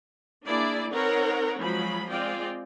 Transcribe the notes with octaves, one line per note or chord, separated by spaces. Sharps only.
A#3 D4 E4 G#4 D5
C4 D#4 A#4 B4 C#5 F#5
F3 F#3 G#3 B5
G#3 C4 F4 D5 G5